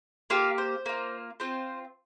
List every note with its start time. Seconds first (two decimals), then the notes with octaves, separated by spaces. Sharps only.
0.30 A#3 F4 G4 F5
0.58 C5
0.86 A#3 F4
1.40 C4 F4 C5